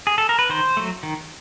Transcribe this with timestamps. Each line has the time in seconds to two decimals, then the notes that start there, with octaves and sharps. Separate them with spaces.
0.07 G#4
0.18 A4
0.29 A#4
0.39 B4
0.49 D#3 C5
0.77 F#3 A3
1.03 D#3